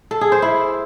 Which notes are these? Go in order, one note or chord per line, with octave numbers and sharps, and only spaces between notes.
A4
G#4
C5
E4